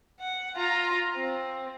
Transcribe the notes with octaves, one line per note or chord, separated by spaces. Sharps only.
F#5
F4 A#5
C4